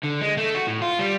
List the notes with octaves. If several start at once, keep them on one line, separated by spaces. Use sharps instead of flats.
D3
G#3
A3
F#4
A2
F4
G3